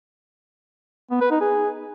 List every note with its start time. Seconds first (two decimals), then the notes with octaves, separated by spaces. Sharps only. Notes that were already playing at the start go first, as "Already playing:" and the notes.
1.11 B3
1.21 B4
1.31 D#4
1.41 G#4